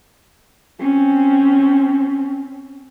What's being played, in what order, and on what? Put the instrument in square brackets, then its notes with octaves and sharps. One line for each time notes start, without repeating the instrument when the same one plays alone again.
[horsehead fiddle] C4 C#4